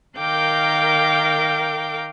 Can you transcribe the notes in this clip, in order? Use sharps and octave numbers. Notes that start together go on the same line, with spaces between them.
D#3 A#4 F5 G5 D6 G6